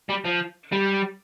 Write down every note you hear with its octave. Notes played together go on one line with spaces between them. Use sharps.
G3
F3
G3